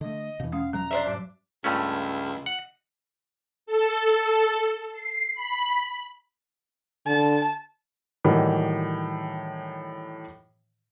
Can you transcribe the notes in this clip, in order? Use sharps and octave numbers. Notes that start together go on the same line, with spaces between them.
D3 A3 D#5
E2 B2 E3
G#3 C#4 F5 D#6
B2 F3 F#3 G#3 A#5
D4 C5 E5
G#2 F#3 D6
C#2 G2 A3 C#4
F#5
A4
C7
B5
D3 A5
A2 D#3 E3 F#3 G3 A#3